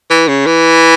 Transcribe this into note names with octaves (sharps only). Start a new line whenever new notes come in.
E3
C#3
E3